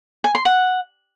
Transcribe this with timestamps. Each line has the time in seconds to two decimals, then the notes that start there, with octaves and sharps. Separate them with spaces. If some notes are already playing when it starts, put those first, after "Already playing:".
0.24 G#5
0.35 C6
0.45 F#5